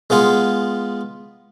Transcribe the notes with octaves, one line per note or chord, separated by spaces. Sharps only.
G#3 B3 F4 G#4